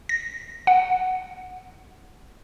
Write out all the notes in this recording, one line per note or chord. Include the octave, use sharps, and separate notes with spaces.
A#6
F#5